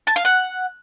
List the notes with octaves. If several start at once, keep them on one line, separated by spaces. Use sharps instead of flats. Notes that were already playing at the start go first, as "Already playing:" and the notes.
A5
F5
F#5